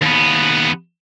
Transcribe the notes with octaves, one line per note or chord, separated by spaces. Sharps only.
D#2 B3